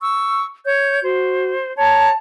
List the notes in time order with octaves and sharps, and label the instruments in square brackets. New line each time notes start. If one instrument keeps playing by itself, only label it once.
[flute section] C#6 E6
C#5 G6
[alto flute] F#4 [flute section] C5
[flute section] C#5 A#5 [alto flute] A5